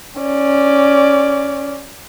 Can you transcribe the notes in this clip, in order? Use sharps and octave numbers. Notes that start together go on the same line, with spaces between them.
C#4 D5